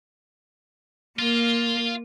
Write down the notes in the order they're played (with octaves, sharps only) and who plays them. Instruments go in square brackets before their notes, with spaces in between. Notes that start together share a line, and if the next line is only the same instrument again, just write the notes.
[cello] A#3 [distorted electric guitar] F4